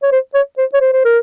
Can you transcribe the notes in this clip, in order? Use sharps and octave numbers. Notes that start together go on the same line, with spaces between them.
C#5
C5
C#5
C5
C#5
C5
C5
A#4